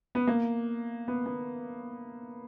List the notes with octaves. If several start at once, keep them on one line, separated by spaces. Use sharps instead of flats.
B3
A#3
B3
B3